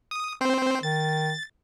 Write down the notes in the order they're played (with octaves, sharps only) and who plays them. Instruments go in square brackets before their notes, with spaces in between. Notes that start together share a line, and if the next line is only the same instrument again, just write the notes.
[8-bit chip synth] D#6
C4 C5
[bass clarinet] D#3 [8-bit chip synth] A6